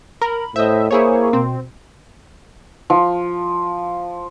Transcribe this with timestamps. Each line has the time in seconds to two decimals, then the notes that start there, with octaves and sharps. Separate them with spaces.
0.22 A#4 B5
0.56 A2 C5 D#5 E5
0.91 A#3 E4 G#4 C5 C#5
1.33 B2 C4
2.90 F3